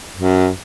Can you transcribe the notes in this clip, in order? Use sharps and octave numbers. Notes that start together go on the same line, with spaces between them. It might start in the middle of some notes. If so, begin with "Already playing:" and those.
F#2